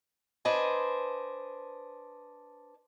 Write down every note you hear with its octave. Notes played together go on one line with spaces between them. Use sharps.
D4 B4 C5 D#5 G#5